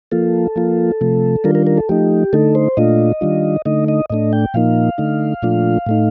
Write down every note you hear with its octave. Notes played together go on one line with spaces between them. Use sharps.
F3 A#3 F4 A4
F3 A#3 F4
C3 F3 A3
D#3 G3 D4 F4 A#4
A#4
A#4
A4
F3 A3 D#4 G4
D3 A3 D#4 A4
C5
A#2 A3 D4 F4 D#5
D#3 G3 D4 F4
D3 A3 D#4 D#5
D#5
A2 A3 D4 D#5
G5
A#2 F3 A#3 D#4 F5
D3 A3 D#4
A#2 F3 A3 D4 F4
A2 A3 D#4